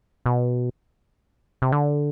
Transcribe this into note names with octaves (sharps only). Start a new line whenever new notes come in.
B2
C3
D3